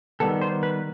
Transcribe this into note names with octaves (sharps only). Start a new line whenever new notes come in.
D#3 G3 B3 A4
C5
B4